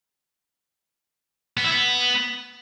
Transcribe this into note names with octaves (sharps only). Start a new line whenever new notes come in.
B3
E4
B3